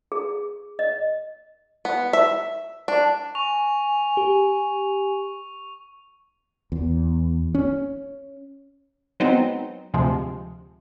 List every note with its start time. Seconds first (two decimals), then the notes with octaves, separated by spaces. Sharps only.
0.12 G#4
0.79 D#5
1.85 B3
2.13 E5
2.88 D4
3.35 G#5 C#6 F7
4.17 G4
6.72 E2
7.55 C#4
9.20 F#3 G#3 B3 C4 D#4
9.94 D2 C3 F3 G#3